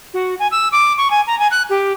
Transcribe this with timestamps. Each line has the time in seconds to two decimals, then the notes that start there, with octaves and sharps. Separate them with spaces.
0.14 F#4
0.39 G#5
0.51 E6
0.72 D6
0.98 C#6
1.11 G#5
1.27 A#5
1.39 G#5
1.51 F#6
1.70 G4